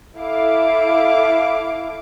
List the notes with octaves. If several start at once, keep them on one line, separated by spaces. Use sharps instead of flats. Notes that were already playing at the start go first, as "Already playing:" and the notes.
E4 A4 F5 D6